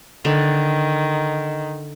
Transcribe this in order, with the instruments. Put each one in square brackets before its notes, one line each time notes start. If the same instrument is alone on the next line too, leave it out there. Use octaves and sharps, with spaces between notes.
[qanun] D3 [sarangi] D#3